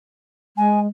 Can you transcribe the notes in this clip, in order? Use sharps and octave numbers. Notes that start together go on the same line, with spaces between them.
G#3 G#5